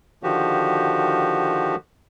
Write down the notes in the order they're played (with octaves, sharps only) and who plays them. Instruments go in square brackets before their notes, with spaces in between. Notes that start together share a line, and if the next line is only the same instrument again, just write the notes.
[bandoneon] D3 D#3 F3 F#4 G4